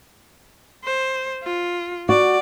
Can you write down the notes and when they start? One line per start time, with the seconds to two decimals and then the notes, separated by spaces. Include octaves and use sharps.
0.85 C5
1.43 F4
2.09 F#4 D5